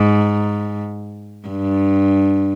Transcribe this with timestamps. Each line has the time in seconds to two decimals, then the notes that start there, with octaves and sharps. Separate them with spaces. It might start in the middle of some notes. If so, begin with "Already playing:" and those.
Already playing: G#2
1.48 G2